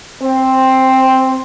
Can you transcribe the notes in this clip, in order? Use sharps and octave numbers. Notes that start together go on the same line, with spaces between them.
C4